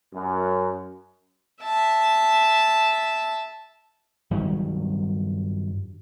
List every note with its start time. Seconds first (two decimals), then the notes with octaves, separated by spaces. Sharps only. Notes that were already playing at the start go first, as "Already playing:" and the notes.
0.12 F#2
1.62 E5 A5
4.31 G2 D#3 F#3 G3